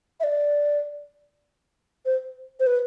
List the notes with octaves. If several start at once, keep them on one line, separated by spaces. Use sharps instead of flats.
E5
D5
C5
C5
B4